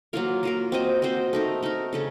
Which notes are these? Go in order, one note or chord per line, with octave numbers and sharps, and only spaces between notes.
F#3 A#3 F4 A#4
F#3 A#3 F4 A#4
C4 F#4 C5 D#5
C4 F#4 C5 D#5
A3 D#4 A#4
A3 D#4 A#4
C#3 A3 C#4